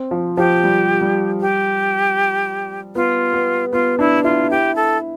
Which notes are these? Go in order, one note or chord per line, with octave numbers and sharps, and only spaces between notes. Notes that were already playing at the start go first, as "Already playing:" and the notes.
Already playing: C4
F3
F3 G4
G3
G3
G4
B3 F4
B3
B3 F4
D4 E4
E4 F4
E4 G4
A4